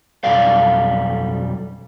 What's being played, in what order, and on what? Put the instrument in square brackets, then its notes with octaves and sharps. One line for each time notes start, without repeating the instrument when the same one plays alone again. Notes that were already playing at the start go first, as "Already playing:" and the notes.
[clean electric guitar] B1 F2 G3 A4 D5 F5